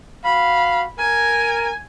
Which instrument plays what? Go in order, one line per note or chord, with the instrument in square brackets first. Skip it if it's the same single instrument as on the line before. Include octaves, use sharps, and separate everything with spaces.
[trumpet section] F#4 F5 [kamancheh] B5
[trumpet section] A#4 [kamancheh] G#5